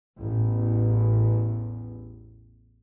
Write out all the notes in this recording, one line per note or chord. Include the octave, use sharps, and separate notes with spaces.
A1 E2